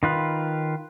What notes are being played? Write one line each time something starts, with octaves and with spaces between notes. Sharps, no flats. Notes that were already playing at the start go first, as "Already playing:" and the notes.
D#3 F4 B4